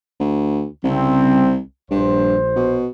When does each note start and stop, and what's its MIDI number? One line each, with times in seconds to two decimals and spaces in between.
0.20 0.67 38
0.84 1.60 36
0.84 1.55 49
0.84 1.55 55
0.84 1.55 60
1.91 2.83 34
1.91 2.37 43
1.91 2.83 72
2.56 2.89 47